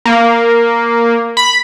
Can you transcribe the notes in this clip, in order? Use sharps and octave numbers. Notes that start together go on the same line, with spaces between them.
A#3
B5